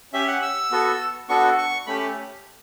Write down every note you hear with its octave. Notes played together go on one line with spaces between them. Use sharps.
C#4 G4 E5
F#5
E6
B3 F#4 A4
B3 D4 F#4 A4 C#6
C#6
A3 C#4 G4 B5